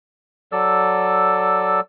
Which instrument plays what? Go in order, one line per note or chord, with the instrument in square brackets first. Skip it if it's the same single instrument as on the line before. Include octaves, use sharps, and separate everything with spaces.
[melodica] F#3 A4 D5 E6